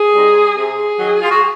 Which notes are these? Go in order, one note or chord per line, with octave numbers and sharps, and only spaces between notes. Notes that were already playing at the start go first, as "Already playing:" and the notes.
Already playing: G#4
G3 C4 D#4
C3 G#4
D#3 F#3
F4
F#4